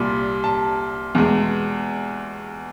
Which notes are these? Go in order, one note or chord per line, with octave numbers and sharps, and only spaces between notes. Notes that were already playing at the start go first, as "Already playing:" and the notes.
Already playing: C2 A#2 G3
A5
E2 B2 G#3